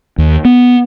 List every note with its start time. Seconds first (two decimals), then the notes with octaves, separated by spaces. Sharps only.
0.18 D#2
0.45 B3